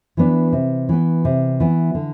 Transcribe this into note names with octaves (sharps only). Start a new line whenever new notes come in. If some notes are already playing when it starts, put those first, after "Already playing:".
E3 B3 D4
C3
E3 B3
C3
E3 B3
D3